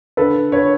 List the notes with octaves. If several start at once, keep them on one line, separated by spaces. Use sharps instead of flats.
D3 A4 B4
D3
D3 B4 C#5